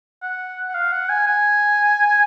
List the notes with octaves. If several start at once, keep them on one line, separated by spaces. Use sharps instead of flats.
F#5
F#5
F5
F#5
G#5
G#5